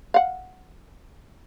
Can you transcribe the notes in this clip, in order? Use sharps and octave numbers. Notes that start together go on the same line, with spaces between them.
F5 F#5